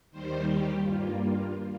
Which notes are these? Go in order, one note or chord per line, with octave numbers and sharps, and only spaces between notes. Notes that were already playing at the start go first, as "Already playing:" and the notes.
D#2 D#3 G3 C5
G4
G2 G3 A#3 F4
F4